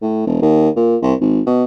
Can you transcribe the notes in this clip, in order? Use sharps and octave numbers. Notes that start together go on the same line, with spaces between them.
A2
E1
D#2
A#2
C2
G#1
B2